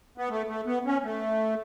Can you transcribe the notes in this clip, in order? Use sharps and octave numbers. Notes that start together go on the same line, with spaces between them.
B3
A3
A3
B3
C#4
A3